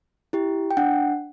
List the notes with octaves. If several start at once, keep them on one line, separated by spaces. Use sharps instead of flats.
E4 G4
G5
D4 F#5